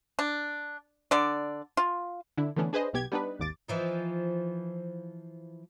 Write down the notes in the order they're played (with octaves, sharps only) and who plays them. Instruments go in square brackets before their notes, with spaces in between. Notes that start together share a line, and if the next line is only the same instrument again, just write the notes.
[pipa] D4
D3 D5
F4
[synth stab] D3 D4 E4
D3 E3 A3 B3 C#4 D4
D4 G#4 B4 C5 D#5
B1 B2 G4 G#6
G3 B3 D4 D#4 B4
G#1 D#2 D6 A6
[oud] E3 F3 D#4